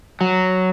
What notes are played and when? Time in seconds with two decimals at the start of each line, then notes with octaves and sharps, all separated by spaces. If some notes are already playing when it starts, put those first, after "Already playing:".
0.21 F#3